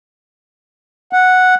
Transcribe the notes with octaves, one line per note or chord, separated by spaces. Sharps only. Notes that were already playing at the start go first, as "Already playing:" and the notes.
F#5